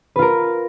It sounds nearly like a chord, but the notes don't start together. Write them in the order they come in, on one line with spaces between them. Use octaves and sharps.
B4 F4 A#4